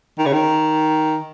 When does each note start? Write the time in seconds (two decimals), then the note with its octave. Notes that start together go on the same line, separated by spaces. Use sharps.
0.18 D#3
0.26 C#3
0.33 D#3